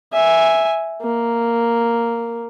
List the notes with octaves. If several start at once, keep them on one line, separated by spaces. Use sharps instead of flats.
E5 G#5
A#3